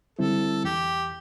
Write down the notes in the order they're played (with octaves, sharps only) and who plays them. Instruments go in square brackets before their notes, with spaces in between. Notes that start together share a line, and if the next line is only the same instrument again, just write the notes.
[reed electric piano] D3 G3 C4 E4 [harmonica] A4
[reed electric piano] E2 [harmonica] G4